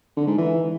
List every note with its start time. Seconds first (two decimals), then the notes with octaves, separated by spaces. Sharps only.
0.17 D3
0.27 G#2
0.38 E3